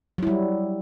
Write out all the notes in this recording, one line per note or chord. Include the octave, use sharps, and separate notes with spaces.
F#3 G3 E4